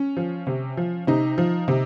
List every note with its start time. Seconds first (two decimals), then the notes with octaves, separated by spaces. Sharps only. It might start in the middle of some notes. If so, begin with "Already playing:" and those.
Already playing: C#4
0.17 F3
0.47 C3
0.77 F3
1.07 C3 D#4
1.38 F3
1.68 C3